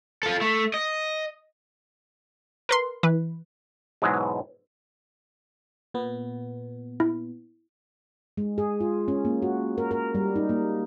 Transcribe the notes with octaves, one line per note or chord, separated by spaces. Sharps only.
F4 A4
A3
D#5
A#4 B4 C6
E3 B4
G#2 B2 E3 F#3 G#3
A#2 B3
E4
G#3
G#4
F4
C#4
A#3
F#4
A#4
A#4
G3
D#4
A#3